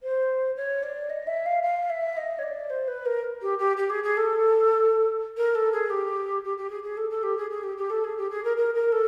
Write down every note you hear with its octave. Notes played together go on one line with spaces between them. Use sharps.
C5
C#5
D5
D#5
E5
F5
F5
E5
D#5
C#5
D5
C5
B4
A#4
G4
G4
G4
G#4
G#4
A4
A#4
A4
G#4
G4
G4
G4
G#4
G#4
A4
A4
G4
G#4
G#4
G4
G4
A4
G#4
G4
G#4
A#4
A#4
A#4
A4